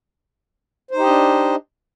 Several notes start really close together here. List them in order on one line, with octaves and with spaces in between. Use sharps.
C5 D#4 G4 D#5 D4